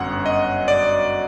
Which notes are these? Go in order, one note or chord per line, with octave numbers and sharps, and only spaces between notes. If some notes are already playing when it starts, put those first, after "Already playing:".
Already playing: G1 F#2 F#3 F#5
D#5
D5